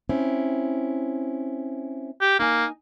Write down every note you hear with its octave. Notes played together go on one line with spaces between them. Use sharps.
C4 C#4 E4
G4
A#3 D#4 G#5